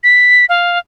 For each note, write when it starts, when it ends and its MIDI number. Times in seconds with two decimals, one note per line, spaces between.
0.04 0.45 95
0.49 0.79 77